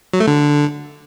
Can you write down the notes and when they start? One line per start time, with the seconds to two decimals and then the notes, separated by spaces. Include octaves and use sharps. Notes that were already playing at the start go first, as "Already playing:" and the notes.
0.14 F#3
0.20 A3
0.27 D3